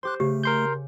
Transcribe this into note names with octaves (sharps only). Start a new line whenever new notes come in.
G4 C5 C6 D6 F#6
C#3 A3 G4
A#4 C6 G6